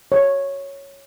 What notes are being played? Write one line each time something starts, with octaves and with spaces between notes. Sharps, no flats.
C#5